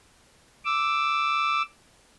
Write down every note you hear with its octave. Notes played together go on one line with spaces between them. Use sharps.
D6 E6